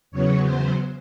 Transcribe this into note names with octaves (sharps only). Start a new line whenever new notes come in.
E2 C#3 F#3 B3 C#5
C5